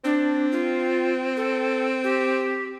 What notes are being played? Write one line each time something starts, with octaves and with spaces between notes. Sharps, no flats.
C4 D4
F4
A4
G4